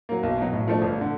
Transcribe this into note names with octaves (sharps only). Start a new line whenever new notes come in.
F#3 A#3
B1
B2 F#3
A2
F3 A3 D4
G1
D3